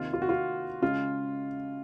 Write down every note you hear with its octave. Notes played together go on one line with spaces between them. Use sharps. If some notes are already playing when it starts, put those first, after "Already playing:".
Already playing: C3 D#3 A#3 F4
F4
F#4
F4
C#3 G#3 F4